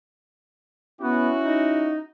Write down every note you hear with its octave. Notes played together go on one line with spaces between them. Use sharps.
B3 C#4 E4 F#4
D#4